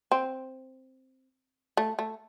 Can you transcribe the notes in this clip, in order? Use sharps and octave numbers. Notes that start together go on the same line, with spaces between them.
C4
A3
A3